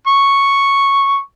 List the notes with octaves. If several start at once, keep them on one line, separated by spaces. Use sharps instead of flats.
C#6